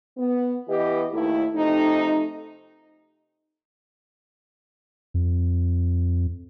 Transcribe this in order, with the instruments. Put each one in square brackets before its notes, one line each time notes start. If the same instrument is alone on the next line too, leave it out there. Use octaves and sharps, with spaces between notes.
[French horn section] B3
E3 B3 G4 D#5
D#2 A3 E4
F2 C3 A3 D#4
[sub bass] F2